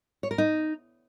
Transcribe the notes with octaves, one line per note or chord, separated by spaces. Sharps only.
C#5
A#4
D#4